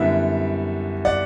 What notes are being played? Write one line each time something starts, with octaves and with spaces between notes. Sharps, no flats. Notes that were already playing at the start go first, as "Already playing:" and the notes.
Already playing: F#2 D3 G3 B3 E4 E5
D5 F#5